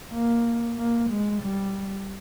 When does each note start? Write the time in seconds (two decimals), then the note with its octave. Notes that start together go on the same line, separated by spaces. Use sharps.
0.13 A#3
0.78 A#3
1.10 G#3
1.43 G3